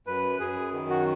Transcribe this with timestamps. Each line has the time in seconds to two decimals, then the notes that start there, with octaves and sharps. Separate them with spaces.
0.07 F#2 B4
0.40 F#2 G#4
0.73 D#3
0.90 F#4